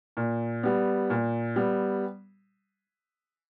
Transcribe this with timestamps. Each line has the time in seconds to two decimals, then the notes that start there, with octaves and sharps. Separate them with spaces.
0.17 A#2
0.63 G3 B3
1.10 A#2
1.56 G3 B3